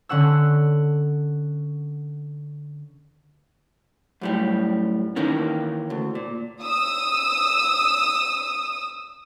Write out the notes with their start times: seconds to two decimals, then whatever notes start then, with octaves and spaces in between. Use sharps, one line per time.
0.09 D3 C#4 F#5 E6
4.21 F#2 A2 G3
5.16 D#3 E3 A#3 C#4
5.90 D2
6.15 A#2
6.64 D#6 E6